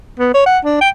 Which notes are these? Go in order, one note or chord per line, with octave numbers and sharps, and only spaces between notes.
B3
C#5
F#5
D4
G5